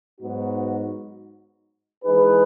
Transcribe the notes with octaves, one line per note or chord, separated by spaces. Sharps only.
G#2 F#3 B3 D#4 F#4
E3 G#3 D#4 G#4 B4